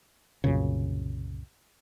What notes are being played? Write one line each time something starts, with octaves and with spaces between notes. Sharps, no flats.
C2 F#2 A#2 C#3